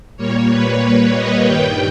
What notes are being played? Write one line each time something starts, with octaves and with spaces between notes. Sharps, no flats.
A#2 G3 A#3 C#5
B4
D#5
G2 D#3 G3 G5